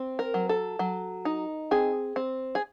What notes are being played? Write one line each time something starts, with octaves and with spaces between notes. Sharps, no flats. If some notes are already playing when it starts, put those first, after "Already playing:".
Already playing: C4
A#4
F#3
A4
F#3
D#4
C4 G#4
C4
G#4